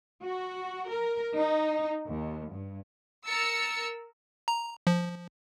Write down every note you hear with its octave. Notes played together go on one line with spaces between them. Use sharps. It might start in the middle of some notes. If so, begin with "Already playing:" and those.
F#4
A#4
D#4
D#2
G2
A#4 E6 A6 C#7
A#5
F3